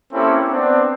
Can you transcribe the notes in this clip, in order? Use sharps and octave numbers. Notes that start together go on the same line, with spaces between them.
A#3 C4 C#4 E4 G4 A4
B3 C4 D4